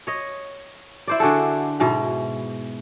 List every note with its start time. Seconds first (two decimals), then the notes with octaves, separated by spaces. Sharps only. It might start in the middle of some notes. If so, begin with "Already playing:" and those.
0.07 C#5 D#5
1.08 E4 C5 D5
1.20 D3 F#4 G#4 A4
1.80 G#2 B2 E4